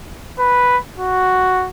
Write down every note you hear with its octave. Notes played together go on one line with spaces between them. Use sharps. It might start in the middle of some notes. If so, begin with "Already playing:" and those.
B4
F#4